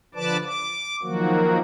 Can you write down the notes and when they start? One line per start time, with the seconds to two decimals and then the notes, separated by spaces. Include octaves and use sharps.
0.15 D3 F3 B4 D5 A5 D6
0.45 D6
1.03 D#3 F3 F#3 A#3 F#4